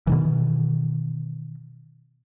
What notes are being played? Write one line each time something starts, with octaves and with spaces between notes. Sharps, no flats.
B2 D#3 E3